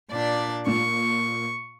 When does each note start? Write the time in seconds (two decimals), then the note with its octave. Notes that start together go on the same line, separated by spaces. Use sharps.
0.11 A#2 D4 D5
0.67 A#2 C#6